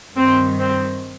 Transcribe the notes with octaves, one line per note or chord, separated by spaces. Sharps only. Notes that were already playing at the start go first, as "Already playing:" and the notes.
G2 D#3 C4
C4